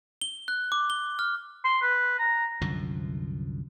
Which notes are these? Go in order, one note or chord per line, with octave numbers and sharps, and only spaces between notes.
G7
F#6
D6
G7
F6
C6
B4
A#5
C2 F#2 D3 F3